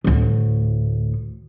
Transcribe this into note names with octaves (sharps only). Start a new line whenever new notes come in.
D2 A2